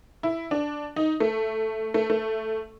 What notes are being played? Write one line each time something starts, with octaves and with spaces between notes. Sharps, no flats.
E4
D4
D#4
A3
A3
A3